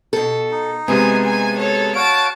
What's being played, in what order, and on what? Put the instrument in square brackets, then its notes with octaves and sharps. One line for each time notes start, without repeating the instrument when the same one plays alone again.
[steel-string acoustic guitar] B2 A4
[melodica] D#4
[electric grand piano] C3 G#3 B3 [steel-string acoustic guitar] G#4 [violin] G#5
[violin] G#5
A4 C#5
[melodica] F#4 C#5 F5 [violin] A5 D7